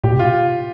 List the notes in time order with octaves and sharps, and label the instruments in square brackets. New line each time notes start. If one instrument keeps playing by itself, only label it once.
[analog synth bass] A#2 [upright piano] G4
[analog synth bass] C3
[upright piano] F4